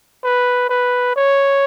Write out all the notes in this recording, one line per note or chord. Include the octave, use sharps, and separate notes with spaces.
B4
B4
C#5